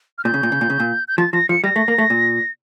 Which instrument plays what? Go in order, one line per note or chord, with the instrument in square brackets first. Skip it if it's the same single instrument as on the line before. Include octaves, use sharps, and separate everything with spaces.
[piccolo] F6
[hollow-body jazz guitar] A#2 [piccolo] G6
[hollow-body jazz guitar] C#3
A#2
C#3
A#2
C#3
A#2
[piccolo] G6
[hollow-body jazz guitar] F3 [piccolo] A6
[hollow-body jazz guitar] F3 [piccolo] A#6
[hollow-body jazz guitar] F3 [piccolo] C#7
[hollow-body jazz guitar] G3 [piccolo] A#6
[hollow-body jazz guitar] A3
A#3
A3
A#2